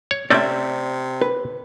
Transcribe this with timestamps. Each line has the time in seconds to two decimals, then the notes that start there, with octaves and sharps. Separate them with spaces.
0.11 C#5
0.30 C3 A3 C4 C#4 D5 E5
1.22 B4